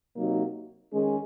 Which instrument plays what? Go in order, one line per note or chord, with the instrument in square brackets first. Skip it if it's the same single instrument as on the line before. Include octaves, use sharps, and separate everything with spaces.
[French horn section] C3 F#3 A#3 D#4
D#3 G#3 C#4 G#4